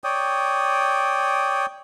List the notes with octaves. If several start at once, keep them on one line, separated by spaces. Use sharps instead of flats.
C#5 D5 G5 D#6